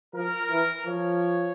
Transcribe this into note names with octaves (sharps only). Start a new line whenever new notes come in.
F3 A#4
E3
F3 C#5